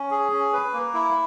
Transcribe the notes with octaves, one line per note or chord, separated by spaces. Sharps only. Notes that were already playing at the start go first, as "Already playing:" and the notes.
Already playing: C#4
G#4
C#4
B4
A#3
E4